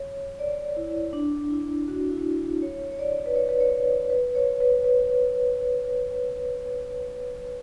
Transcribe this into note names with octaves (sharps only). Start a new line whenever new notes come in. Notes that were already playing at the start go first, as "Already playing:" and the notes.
Already playing: C#5
D5
E4
D4
E4
F#4
E4
E4
C#5
C#5
D5
B4
C#5
B4
C#5
B4
C#5
B4
B4